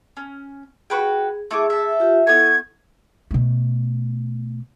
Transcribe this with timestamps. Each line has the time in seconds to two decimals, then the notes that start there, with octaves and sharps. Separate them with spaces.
0.17 C#4
0.90 F#4 G#4 B4 G5
1.51 A3 E4 G#4 D6 E6
1.70 A4 E5
2.00 F4 G4
2.27 B3 E4 A4 C#6 G#6
3.31 B2 A3